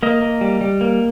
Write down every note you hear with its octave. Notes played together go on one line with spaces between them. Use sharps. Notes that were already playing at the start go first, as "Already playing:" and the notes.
A#3 D#5
A#3
G3
G3
A#3